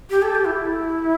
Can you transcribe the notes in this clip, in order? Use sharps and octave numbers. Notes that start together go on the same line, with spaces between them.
G4
A4
G4
E4